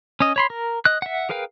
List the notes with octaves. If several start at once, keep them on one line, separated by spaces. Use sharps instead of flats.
C#4 D#5
C#5 B5 C6
A#4
D#5 F#6
E5 F#5
G#4 A#4 B4 F5 G5